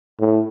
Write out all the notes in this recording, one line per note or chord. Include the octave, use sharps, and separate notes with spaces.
A2